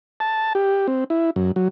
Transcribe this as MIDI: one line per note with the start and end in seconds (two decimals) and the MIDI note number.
0.20 0.53 81
0.55 0.87 67
0.88 1.04 60
1.10 1.30 64
1.36 1.51 42
1.56 1.68 54